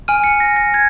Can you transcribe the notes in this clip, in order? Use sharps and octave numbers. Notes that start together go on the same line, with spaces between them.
G#5 F6 D#7
C#7
A#6
A#6
G#6